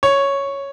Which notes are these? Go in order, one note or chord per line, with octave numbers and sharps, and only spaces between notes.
C#5